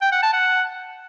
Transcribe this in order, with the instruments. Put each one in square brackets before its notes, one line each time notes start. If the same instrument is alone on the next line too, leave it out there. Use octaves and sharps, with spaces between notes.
[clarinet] G5
F#5
A5
F#5